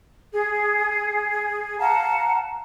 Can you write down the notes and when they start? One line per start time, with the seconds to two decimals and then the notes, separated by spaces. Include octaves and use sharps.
0.33 G#4
1.79 F5 F#5 A5 A#5